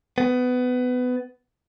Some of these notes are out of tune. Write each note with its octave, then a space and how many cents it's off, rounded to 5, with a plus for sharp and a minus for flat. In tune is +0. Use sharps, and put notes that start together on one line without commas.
B3 +20